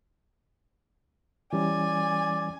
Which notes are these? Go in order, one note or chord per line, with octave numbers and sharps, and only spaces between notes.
E3 G3 C#4 D5 G#5